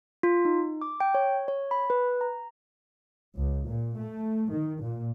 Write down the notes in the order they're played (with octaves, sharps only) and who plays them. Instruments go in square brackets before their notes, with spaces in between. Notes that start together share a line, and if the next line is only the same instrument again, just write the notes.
[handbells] F4
D#4
D6
G5
C#5
C#5
B5
B4
A#5
[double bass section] C#2
A#2
A3
D#3
A#2